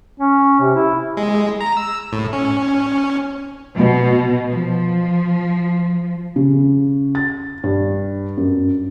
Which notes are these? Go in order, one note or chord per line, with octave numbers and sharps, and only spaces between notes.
C#4
C3
E4
G#3
A#5
E6
A2
C#4
B2
F3
C#3
A6
G2
F#2